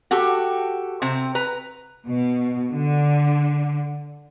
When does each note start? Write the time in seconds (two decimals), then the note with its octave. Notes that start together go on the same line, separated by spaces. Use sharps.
0.11 F#4 G4 A4
1.02 C3 C4
1.35 B4 A#5
2.06 B2
2.72 D3